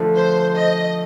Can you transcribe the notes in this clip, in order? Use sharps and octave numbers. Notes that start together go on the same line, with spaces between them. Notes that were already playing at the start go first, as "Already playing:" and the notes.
Already playing: D3 F3 A3
C5
D#5